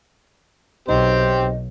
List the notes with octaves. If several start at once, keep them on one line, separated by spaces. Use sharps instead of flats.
B1 C4 D#4 G4 C5